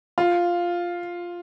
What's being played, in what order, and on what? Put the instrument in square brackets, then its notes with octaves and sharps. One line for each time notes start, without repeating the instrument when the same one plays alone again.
[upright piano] F4